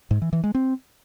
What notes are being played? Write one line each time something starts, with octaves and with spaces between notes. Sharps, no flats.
G#2
E3
E3
G#3
C4